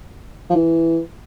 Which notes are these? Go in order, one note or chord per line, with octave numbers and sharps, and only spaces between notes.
F3
E3